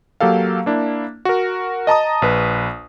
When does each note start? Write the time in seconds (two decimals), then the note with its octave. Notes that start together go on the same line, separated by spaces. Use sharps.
0.20 F#3 A#3 G4 A4 F5
0.66 A#3 D4 E4
1.25 F#4 A#4
1.87 D#5 A5 A#5 D#6
2.22 A#1 B4